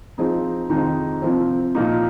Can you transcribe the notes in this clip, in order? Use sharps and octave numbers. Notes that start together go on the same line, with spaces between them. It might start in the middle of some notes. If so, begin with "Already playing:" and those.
F3 C4 D#4 G#4
F2 C3 D#3 G#3 D#4
C3 F3 C4
A#2 F3 A#3 D#4